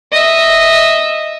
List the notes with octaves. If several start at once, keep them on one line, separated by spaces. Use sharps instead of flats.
D#5 E5